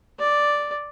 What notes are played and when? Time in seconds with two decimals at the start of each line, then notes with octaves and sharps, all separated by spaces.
0.20 D5